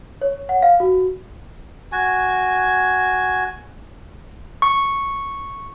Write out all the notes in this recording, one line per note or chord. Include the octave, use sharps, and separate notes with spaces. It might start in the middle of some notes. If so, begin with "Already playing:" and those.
C#5
F#5
F5
F#4
F#4 G#5
C#6